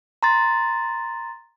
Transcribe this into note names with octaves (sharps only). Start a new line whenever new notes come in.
A#5 C6 A6